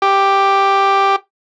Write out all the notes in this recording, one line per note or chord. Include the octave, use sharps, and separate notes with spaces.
G4